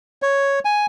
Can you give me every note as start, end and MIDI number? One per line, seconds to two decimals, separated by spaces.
0.22 0.59 73
0.65 0.86 80